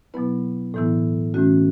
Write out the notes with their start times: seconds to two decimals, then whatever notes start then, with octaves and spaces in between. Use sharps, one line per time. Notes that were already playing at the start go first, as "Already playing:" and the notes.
0.14 B2 F#3 B3 E4 B4
0.74 A2 E3 B3 E4 A4
1.34 A2 E3 A3 C#4 F#4